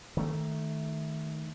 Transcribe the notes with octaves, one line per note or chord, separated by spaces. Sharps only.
D#3 A3